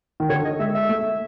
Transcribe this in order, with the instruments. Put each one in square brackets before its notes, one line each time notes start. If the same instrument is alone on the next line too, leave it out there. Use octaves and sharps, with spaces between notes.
[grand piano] D#3
[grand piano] D3 [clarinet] C#5
[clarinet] D#5
[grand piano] G#3 [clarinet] E5
[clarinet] E5
[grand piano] A3